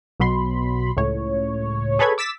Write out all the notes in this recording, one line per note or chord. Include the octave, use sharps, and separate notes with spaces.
B1 B2 F#3 B5 C6
C#2 A2 C#5
G#4 A4 B4 C#5 B5 G#6
D6 E6 A6 B6 E7